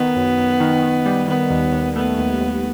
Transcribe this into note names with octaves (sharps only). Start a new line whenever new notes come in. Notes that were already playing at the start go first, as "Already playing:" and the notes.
Already playing: D#3 B3
F#2
F#2
D#3
D#3
G3
D#3 B3
D#2
D#2
A3 B3
D#2
D#2